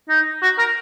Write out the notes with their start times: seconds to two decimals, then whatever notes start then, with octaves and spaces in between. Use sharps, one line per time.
0.09 D#4
0.42 F#4
0.58 A#4